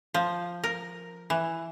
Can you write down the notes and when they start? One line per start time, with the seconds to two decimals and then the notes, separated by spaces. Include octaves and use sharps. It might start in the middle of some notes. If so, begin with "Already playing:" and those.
0.14 F3
0.64 A#4
1.30 E3